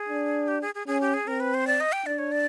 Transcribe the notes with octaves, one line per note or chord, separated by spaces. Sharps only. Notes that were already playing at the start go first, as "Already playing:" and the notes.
Already playing: G#4
D4
G4
G#4
G#4
C#4 G#4
G4
G#4
C4 A#4
B4
C5
D5
D#5
G5
D4 D5
C#5
D5